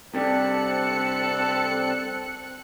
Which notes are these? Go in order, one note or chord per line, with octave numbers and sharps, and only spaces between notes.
C3 G3 C4 D4 A4 F#6 C#7